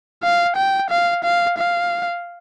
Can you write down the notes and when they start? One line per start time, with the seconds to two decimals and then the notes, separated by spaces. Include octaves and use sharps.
0.23 F5
0.56 G5
0.90 F5
1.24 F5
1.58 F5